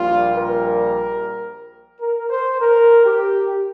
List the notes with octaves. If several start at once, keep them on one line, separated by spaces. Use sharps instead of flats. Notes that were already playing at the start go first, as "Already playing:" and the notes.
Already playing: A#1 A#2 G3 F4
A#4
A#4
C5
A#4
G4